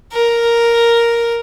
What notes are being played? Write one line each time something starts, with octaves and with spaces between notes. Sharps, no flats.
A#4